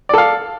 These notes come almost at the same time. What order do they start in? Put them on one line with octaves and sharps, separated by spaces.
D5 A4 F5